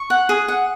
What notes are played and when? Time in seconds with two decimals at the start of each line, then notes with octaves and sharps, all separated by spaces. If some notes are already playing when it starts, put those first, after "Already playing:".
Already playing: C#6
0.10 F#5
0.29 G#4
0.48 F#5